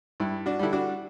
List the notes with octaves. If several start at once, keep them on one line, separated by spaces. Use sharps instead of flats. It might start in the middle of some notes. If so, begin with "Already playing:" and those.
G2 E4
D4 F#4
D3 G3 E4
D4 F#4